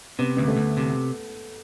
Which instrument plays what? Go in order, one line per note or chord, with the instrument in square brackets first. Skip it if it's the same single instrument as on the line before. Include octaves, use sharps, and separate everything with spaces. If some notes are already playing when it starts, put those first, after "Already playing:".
[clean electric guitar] C3 [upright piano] B3
[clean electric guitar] D2 [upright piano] B3
[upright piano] A3
[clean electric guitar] D2
C3